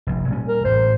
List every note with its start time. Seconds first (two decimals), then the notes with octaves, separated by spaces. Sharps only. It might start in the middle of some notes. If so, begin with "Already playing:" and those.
0.07 F1 A#1
0.28 A#2 G3 C#4
0.48 A#4
0.64 A1 A2 C5